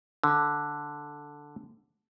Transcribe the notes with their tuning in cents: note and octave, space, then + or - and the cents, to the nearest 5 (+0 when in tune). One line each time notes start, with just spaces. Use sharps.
D3 +0